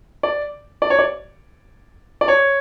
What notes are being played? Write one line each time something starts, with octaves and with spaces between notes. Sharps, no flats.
D5
D5
C#5
D5
D5
C#5